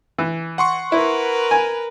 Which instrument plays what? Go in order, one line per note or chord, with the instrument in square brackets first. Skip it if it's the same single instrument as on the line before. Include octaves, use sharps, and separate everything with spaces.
[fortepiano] E3
[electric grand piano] F#5 C6 C#6
[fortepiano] E4 [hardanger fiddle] A#4 B4
[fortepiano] G#5